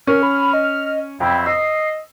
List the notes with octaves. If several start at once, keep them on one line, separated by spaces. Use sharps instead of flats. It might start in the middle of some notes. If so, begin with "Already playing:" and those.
C#4 A#4 F6
B5
D#5
F2 F#3 C4 E4 G5
D#5 E6 C7